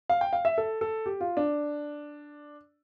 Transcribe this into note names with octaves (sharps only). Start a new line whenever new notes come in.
F5
G5
F5
E5
A4
A4
G4
F4
D4